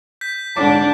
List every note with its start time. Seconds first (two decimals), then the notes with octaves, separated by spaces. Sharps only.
0.21 G6 B6
0.57 G#2 D3 D4 A5 D6